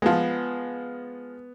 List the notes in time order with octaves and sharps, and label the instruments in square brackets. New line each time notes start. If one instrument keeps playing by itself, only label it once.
[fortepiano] F3 G#3 [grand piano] B3